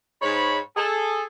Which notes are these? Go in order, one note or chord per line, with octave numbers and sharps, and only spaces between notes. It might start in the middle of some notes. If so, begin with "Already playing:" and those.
G#2 C#5 B5
G#4 A4